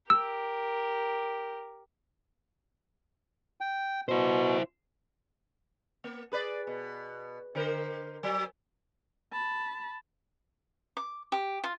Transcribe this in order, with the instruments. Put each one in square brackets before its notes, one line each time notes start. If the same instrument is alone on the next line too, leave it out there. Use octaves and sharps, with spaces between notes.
[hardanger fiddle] G4 A#4 [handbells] E6
[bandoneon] G5
[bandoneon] B2 [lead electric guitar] E4 C5
[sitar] A#3
G#4 B4 D5
B2
D3 A#4 C5
F#3
[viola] A5 B5
[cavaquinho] D6
G4
F4